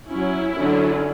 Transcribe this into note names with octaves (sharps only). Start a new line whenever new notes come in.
F#3 C#4 E4
D3 F#3 C#4